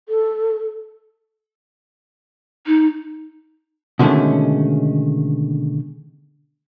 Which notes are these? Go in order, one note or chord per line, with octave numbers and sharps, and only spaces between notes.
A4
D#4
B2 D3 D#3 G#3 A3 C#4